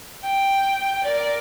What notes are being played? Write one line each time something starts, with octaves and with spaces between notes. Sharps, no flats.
G5
A#4 D5